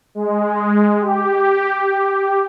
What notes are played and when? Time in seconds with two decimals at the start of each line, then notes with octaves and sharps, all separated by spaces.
0.15 G#3
1.01 G4